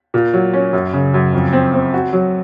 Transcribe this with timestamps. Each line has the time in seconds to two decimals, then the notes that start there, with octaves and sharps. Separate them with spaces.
0.14 A#2
0.33 F#3
0.53 C#4
0.73 F#2
0.93 C#3
1.14 F#2
1.33 F2
1.53 C4
1.74 C4
1.94 F#4
2.13 F#3